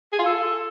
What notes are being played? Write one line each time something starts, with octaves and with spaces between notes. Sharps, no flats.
G#4
F4
A4